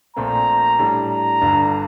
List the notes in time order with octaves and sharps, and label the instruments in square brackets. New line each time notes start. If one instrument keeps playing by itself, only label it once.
[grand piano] A#1 A#2 A3 C4 [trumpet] A#5
[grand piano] A2 G3 D4
[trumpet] A#5
[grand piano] G1 G2 D3